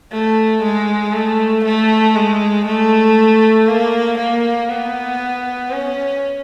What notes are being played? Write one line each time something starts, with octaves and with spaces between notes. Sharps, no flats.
A3
G#3
A3
A3
G#3
A3
A#3
A#3
B3
C#4